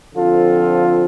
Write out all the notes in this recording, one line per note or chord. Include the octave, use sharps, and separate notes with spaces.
D3 F3 C4 F4 A4